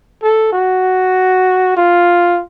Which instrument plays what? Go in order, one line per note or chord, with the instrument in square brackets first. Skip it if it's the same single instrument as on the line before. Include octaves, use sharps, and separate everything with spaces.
[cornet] A4
F#4
F4